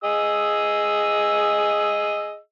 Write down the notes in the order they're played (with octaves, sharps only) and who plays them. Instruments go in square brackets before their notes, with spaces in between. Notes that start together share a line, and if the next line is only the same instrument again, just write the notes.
[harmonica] G#4 D#5 E6